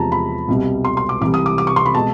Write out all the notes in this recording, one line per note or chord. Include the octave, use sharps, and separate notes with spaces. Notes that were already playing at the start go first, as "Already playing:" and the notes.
Already playing: E2 C3 F3 G#3 A5 A#5
B5
C2 B2 G3
C6
C6
D6
C2 C3 E3 G3 D6
D#6
D6
D6
C#6
C6
B5
B2 G#3 A5